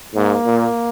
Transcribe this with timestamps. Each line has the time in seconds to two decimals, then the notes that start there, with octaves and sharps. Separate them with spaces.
0.14 G#2 A#3
0.46 A#2